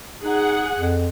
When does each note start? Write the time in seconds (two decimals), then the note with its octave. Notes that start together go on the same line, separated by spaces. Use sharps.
0.23 D#4 G#4 F#5
0.79 F2